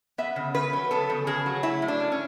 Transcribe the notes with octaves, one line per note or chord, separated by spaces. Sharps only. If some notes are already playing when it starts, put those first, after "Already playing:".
B3 E5
C#3
C#3 B4
F#3
B3 A4
C#3
C#3 G#4
F#3
A3 E4
A2
D4
C#4
C#4